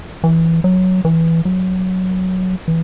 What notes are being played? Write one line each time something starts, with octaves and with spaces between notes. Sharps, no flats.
E3
F#3
E3
F#3
E3